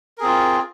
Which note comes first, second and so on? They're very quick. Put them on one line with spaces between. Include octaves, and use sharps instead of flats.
A#4 G#4 C4 F4